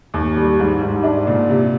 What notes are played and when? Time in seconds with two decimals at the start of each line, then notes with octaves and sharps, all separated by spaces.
0.14 D#2
0.37 G3
0.59 G#2
0.81 G#2
1.04 D4
1.27 A#2
1.49 C3